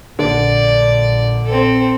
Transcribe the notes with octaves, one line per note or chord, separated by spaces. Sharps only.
A#1 D3 D5
C4 A4